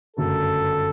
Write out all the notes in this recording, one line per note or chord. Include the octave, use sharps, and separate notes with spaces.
G1 F#2 C#3 F#3 A3 A4